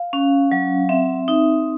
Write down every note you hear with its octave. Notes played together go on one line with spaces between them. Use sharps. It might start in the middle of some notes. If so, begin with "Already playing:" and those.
Already playing: F5
C#4
F#3
C4 E5
D#4 E5